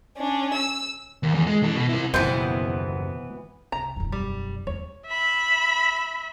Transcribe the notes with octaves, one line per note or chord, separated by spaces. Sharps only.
C#4 D4
E6
D#2
E2
G#3
E3 A4
B2
C3 E4
F#1 D#2 B2 E3 F3 B3 C4 C5
C2 A#5
E1 F#2
G3
E2 G#3 C#5
E5 B5